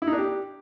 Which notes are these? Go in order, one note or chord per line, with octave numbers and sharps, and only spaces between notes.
E4
D#4
D4
G4